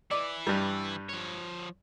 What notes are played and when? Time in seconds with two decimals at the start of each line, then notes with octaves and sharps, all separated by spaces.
0.11 E3 E4 D5
0.47 G2 G3
1.09 F3 C#5